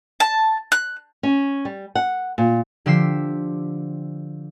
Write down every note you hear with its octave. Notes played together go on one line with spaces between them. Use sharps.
A5
F#6
C#4
G3
F#5
A#2
D3 F3 G4 E6 B6 C7